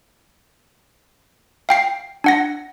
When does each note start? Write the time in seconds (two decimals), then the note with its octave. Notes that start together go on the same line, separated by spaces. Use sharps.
1.69 F5 G5 C7
2.24 D4 F#5 A#6